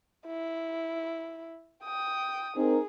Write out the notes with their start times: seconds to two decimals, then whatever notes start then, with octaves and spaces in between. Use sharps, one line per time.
0.26 E4
1.84 G5 D#6
2.56 C4 D#4 G#4 A#4